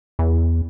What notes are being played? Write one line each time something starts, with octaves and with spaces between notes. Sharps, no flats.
E2